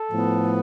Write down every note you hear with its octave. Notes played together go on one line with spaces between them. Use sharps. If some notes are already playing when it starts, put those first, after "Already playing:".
Already playing: A4
A2 F3 B3